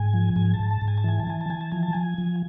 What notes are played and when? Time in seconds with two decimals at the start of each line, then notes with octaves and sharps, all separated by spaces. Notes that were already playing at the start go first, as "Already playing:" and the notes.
Already playing: G#2 G#5
0.14 F3
0.36 G#2 G#5
0.54 A5
0.59 G#2
0.71 A5
0.81 G#2
0.88 G#5
0.97 A5
1.04 E3 G#5
1.20 A5
1.27 E3 G#5
1.41 A5
1.50 E3 G#5
1.61 A5
1.71 F3 G#5
1.83 A5
1.93 F3 G#5
2.18 F3